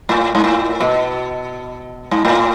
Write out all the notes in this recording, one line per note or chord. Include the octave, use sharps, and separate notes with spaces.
A2
G#2
A2
B2
G#2
A2